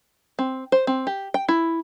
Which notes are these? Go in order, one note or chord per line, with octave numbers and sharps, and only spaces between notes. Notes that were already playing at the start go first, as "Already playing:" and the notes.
C4
C5
C4
G4
G5
E4